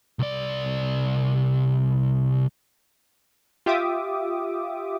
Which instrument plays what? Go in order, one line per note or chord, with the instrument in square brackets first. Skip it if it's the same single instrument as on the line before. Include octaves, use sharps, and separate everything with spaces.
[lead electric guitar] C2 D5
[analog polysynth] F4 G4 E5 D6 D#6